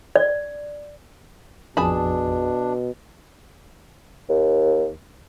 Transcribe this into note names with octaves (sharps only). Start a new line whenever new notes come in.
D5
A1 F2 B2 F3 D4 G#4 A5 B5
D#2